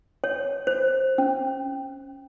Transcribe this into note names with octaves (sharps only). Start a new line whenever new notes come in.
C#5
C5
C#4